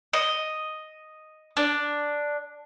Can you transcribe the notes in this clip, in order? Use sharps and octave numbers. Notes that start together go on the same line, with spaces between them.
D#5
D4